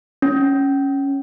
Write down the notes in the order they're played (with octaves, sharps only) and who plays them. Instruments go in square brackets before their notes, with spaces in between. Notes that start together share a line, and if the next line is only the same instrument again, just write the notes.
[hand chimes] C#4